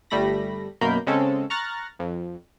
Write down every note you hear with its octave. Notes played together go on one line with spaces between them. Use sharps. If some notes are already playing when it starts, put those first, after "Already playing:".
G1 G3 A3 B5 A#6
F#2 B2 A#3 A#4 B5 G6
C#3 G#3 C4 C#4 A4
A#5 C#6 F6 F#6 A6 A#6
F2